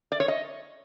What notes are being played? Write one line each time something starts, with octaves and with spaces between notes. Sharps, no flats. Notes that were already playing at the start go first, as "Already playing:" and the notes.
D5
C#5
D#5